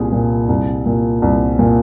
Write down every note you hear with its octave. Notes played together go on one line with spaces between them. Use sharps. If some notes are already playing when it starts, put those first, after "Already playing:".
Already playing: C2 A#2 G#4
A#2
C2
A#2
C2
A#2